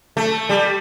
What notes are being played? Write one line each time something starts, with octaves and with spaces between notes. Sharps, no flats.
A3
G3